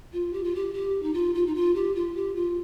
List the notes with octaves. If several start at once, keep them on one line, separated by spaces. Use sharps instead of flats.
F4
G4
F4
G4
G4
D#4
F4
F4
D#4
F4
G4
F4
G4
F4